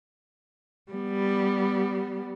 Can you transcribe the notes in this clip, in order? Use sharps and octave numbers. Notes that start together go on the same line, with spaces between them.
G3 B3